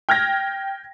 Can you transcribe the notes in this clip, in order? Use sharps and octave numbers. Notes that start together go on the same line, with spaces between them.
G5 F6 G#6 A#6